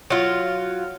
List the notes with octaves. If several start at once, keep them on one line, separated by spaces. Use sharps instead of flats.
F#3 F4